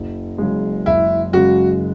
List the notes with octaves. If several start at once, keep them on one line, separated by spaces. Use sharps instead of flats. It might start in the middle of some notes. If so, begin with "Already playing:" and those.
Already playing: F#1
F#2 C#3 G#3
F#1 E4
F#2 C#3 G#3 F#4